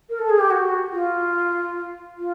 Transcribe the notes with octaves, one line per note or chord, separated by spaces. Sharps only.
A#4
A4
G#4
G4
F#4
F4
F4